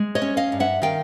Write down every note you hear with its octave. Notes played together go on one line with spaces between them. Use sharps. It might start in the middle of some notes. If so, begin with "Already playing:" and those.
Already playing: G#3
C#5 D#5
C#4
D#5 F5
G2
E5 F#5
D#3 F5 G5